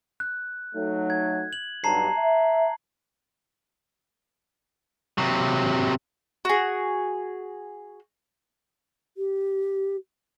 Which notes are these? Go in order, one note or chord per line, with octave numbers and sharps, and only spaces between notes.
F#6
F#3 A3 D#4
G#6
F#7
B1 G2 A5 A#5 C7
E5
C3 F#3
F#4 G#4
G4